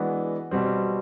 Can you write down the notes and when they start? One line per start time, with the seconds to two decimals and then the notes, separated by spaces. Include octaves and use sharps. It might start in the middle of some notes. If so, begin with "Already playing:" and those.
Already playing: E3 G#3 B3 D4 F#4
0.51 B2 G3 C4